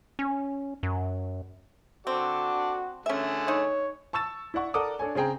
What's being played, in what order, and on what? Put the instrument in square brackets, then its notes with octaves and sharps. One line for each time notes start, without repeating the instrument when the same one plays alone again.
[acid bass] C#4
F#2
[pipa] C4 [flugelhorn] F#4 [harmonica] A4 D5
[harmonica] D3 A3 G#4 [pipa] C#4 E5
[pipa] D#4 [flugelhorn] C#5
[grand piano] A5 C#6 E6 A6 E7
E4 D5 F#5 C#6
A4 A#4 D5 F#5 D6 D#6
D4 A4 C#5 G#5
C#3 C4 G#4 G5 A#5